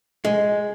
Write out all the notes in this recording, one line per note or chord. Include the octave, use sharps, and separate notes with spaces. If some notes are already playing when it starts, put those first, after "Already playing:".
G#3